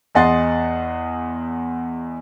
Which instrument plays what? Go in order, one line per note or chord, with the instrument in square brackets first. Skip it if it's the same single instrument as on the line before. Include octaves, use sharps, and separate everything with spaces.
[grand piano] E2 G#4 D#5 F#5 C6 A6